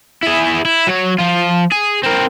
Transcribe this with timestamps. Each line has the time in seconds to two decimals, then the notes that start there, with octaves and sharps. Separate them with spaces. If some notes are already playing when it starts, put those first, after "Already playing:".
0.23 E4 G#4
0.65 E4
0.87 F#3 C#5
1.18 F3 F4
1.71 G#4
2.03 C4 A#4